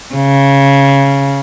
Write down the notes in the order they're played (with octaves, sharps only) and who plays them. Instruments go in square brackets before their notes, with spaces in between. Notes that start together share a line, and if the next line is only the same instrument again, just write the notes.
[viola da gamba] C#3